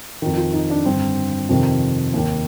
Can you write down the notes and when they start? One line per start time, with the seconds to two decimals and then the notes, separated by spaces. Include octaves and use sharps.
0.22 F2 D#3
0.37 F4
0.53 D#4
0.70 D4
0.85 G2 D3 C4
1.49 F2 C3 D#3
2.14 D#2 D#3